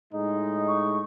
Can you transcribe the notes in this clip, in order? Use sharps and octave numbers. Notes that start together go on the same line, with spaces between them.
A2 G#3 D#4
C#6